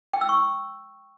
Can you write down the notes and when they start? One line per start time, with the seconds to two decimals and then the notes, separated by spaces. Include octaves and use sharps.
0.13 G5
0.21 E6
0.29 C#6